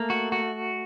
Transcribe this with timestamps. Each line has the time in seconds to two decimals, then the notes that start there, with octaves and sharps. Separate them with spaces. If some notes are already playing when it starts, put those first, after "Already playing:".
Already playing: A3 A#3
0.10 F#4
0.32 F#4